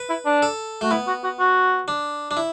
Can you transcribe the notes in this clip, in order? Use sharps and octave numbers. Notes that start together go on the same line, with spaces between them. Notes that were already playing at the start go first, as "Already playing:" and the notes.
Already playing: B4
E4
D4
A4
A3 F#4
B3 E4
F#4
F#4
F#4
D4
D4
E4